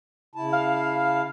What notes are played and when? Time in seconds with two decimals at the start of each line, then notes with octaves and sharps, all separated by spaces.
0.35 C#3 E4 A5
0.53 F5